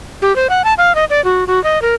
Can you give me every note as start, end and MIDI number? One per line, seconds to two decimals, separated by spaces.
0.22 0.35 67
0.36 0.47 72
0.50 0.62 78
0.64 0.73 81
0.78 0.95 77
0.95 1.05 75
1.10 1.23 74
1.24 1.44 66
1.47 1.62 66
1.64 1.81 75
1.82 1.95 70